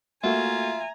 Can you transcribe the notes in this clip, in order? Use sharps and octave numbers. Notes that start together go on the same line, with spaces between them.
A3 A#3 F4 F#4 E5 G#5 A#5